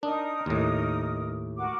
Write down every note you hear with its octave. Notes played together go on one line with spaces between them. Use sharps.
D4 D#4 A#4 D#6
D#2 A2
F#4 A#4 D6